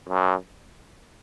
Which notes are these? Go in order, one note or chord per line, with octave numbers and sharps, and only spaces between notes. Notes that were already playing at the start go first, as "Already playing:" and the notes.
F#2